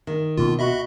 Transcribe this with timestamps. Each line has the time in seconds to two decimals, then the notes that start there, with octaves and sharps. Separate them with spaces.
0.07 D#3
0.38 D2 B2 A#3 F4
0.59 F#4 D#5 E5 B5